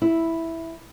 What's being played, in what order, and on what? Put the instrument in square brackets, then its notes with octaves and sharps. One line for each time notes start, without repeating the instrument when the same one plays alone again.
[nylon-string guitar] E4